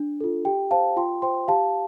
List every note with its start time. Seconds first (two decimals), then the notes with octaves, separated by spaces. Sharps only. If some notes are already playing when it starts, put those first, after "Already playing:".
Already playing: D4
0.21 F4 A4
0.45 G4 G5
0.71 C5 F5 A5
0.97 F4 G5 C6
1.22 C5 G5 C6
1.48 G4 F5 A5